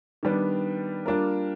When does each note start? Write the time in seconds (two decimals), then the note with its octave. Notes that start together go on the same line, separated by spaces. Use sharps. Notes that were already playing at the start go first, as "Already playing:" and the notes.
0.23 D#3 G3 B3 D4
1.06 G3 A#3 D4 F4 A#4